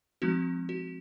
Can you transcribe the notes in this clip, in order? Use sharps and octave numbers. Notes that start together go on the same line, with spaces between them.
F3 G#3 C4 D#4 F#4
F#4